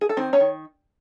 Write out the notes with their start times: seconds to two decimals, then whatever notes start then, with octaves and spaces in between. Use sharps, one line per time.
0.01 G#4
0.09 A4
0.17 D#3 C4 C5
0.33 C#4 C#5
0.40 D#3